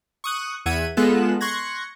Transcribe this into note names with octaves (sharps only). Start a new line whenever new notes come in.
C#6 D#6 F#6
E2 E5 F#5 G#6 D#7
G#3 B3 F4 A4 F#6 E7
C6 C#6 F#6 G#6 A#6